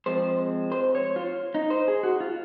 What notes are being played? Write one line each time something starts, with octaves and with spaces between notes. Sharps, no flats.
F3 G#3 C4 C5
C5
C#5
F4
D#4
C5
G#4
F#4
F4